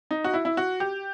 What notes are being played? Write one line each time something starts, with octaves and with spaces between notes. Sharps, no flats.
D#4
F#4
E4
E4
F#4
G4